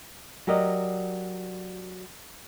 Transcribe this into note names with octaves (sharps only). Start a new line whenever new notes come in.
F#3 G4 A#4 D5 D#5